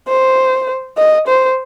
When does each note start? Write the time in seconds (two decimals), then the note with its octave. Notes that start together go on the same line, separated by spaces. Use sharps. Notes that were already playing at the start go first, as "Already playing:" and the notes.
0.08 C5
0.97 D#5
1.27 C5